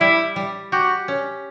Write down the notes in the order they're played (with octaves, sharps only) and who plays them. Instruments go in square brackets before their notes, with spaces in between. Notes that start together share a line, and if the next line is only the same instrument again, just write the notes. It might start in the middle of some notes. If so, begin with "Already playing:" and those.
[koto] G3 [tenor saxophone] E4
[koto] G3
[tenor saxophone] F#4 [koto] G4
[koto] C#4